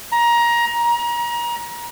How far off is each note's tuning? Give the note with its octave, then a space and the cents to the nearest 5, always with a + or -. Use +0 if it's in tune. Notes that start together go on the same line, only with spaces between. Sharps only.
A#5 +20
A#5 +30